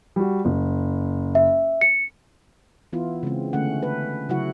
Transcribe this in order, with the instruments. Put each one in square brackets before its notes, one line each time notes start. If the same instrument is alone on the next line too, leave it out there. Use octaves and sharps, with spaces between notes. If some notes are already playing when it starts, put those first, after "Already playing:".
[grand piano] G3 F#4
F#1
[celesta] E5
C#7
[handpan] E3 B3 E4 F4
C#3 G#3 C4
D3 A3 C#4 F#5
B4
C#3 F#3 E4 F#4 F#5